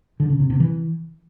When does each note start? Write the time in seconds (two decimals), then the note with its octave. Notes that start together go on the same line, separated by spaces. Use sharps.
0.20 D3
0.30 C#3
0.40 C3
0.50 C3
0.60 E3